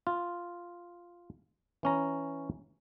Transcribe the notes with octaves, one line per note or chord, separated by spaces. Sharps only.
F4
E3 C#4 A#5